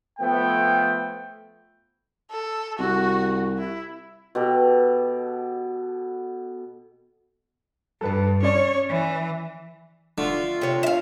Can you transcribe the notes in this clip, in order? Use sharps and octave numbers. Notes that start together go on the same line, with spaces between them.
F3 A3 B3 G5
A4
C2 F#4
E4
B2 G4 A4
G2 A4 B4 A5
C#4 C#5 D5
E3
D3 A3 F4
C3 C#5
E5 F5